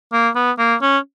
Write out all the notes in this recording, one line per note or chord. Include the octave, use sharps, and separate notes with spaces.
A#3
B3
A#3
C#4